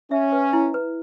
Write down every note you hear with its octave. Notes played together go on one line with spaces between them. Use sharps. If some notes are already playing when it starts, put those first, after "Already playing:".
C#4 E5
B4
E4
B4